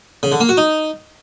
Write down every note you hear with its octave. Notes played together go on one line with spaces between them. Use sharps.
C#3
D3
A#3
F#4
D#4